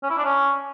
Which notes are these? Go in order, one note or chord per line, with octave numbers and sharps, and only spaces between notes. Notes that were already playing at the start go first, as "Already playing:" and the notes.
C#4
E4
D4
C#4